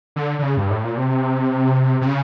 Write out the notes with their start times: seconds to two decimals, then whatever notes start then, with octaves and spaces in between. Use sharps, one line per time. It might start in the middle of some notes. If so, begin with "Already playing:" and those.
0.16 D3
0.39 D3
0.43 C#3
0.57 G2
0.70 A2
0.84 A#2
0.97 C3
2.01 C3
2.06 C#3